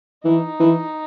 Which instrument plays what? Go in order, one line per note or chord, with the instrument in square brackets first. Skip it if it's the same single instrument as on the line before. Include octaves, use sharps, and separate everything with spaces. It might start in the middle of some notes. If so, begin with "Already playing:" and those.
[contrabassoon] E3 [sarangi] D#4
[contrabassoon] E3